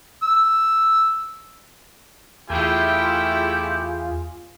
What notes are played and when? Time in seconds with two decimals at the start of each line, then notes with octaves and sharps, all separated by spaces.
0.23 E6
2.50 E2 A3 E4 F4 G4 G#4 G5